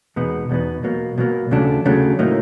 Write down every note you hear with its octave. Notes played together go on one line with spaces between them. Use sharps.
E2 B2 G#3 B3 D#4
E2 B2 G#3 B3 D#4
B2 F#3 A#3
B2 F#3 A#3
D#2 C#3 F#3 A3 D4
D#2 C#3 F#3 A3 D4
A2 F#3 A#3 D#4